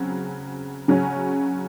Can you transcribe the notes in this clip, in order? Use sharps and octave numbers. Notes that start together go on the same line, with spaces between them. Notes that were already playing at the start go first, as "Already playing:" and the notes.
Already playing: C#3 F#3 C4
C#3 F#3 C#4